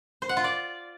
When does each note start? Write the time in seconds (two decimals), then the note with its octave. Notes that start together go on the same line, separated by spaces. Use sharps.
0.22 C5
0.29 F#5
0.37 F4
0.44 D5